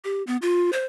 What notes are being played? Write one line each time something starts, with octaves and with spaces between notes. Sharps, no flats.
G4
B3
F4
C5